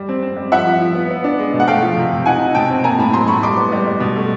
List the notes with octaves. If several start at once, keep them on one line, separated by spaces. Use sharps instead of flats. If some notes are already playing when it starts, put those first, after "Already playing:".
Already playing: G3
C4
C4
G3
F3 E5 F#5
F3
F3
B3
B3
D4
G#3
B2
F#5
A3 F5 G5
F3
C3
C3
D#4 F#5 G#5
D#4
B2 G5 A5
C4
A#3 G#5 A#5
A2 A5 B5
F#3 A#5 C6
A2 B5 C#6
G3 C6 D6
B3
G3
G3
B2
A3